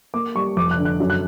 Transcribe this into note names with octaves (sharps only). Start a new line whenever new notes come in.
A#3 D6
G3 C#6
F1 D6
F#6
D3
F#6
F#2
F#6